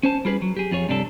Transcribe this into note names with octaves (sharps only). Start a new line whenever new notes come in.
C#4 C5 A5
G3 F4 G#4 B4
F#3
G4 G#4
F2 F4 G#4 C#5
G2 C3 G3 D4 E4 A4